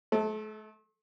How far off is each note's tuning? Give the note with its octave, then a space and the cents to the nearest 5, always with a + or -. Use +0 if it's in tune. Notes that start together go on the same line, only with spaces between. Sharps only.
A3 -40 A4 +0